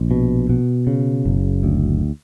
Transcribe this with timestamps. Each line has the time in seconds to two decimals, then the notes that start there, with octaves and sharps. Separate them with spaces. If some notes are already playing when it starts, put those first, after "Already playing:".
Already playing: A#1
0.11 B2
0.50 B2
0.87 C#3
1.25 F#1
1.63 D2